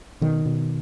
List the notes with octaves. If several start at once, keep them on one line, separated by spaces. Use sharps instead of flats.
B2 D#3
B2